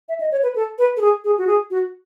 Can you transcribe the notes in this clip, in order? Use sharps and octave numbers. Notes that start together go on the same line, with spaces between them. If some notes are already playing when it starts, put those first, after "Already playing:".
E5
D#5
C#5
B4
A4
B4
A4
G#4
G#4
F#4
G#4
F#4